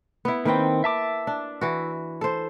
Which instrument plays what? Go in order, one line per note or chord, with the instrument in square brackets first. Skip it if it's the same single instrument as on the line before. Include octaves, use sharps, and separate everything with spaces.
[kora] B3 E4
[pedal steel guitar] D#3 C4 [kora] A#3 B4 G5
[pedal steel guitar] E5 A5 D6
[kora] D4
E3 F#4
A4 C5